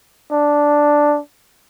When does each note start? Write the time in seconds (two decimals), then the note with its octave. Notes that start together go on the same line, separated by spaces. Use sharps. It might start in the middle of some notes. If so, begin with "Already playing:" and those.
0.32 D4